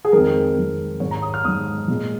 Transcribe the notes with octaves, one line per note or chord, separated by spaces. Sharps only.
G#4
F2 D#3 G#3 A#4
F2 D#3 G#3
G#2 D#3 G#3 C#5
A#5
D#6
F6
G#2 D#3 G#3 D#6
A#2 G#3